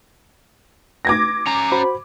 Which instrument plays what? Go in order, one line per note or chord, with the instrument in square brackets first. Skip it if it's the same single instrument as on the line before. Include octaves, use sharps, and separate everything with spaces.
[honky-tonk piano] D6 G#6 A#6
[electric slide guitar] C#4 A#5
[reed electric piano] F#4 C5 B5